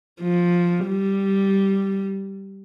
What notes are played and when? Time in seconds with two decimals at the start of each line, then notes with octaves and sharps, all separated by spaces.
0.21 F3
0.86 G3